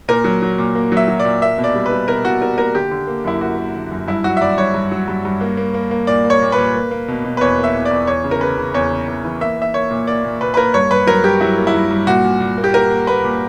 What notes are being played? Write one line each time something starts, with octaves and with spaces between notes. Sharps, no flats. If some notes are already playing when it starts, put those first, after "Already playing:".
A#2 A#4
F#3
F#3
A#2
A#3
F#3 E5
F#3
D5
A#2
A#3 E5
B2
D5
G3
B4
G3
B2 A#4
B2 F#4
G3 A#4
A#3 A#4
D3 G4
D3
A#3
F#2 E4
A#3 F#4
A#3
D3
F#2
G2 E4
F#3 F#4
E5
G2 D5
G2 C#5
G2
F#3
G2
G2
A#3
A#3
A#3
A#3
A#2 D5
A#3
C#5
A#2
B4
A#2
A#3
A#3
B2
B2
B4
E2 C#5
A#3
E5
E2
D5
E2
E2 C#5
C#3
A#4
C#3 B4
C#3
E2 C#5
C#3
E2
E3
A#3 E5
A#3 E5
A#3 C#5
A#2
A#3 D5
A#2
A#2 B4
B4
A#3 A#4
G2 C#5
G2 B4
F#3 A#4
G2 G4
F#3 E4
A#3
E4
G2
G2
A#2 F#4
A#2
A#2
A#3
G4
A#3 A#4
A#3
A#3 B4
A#2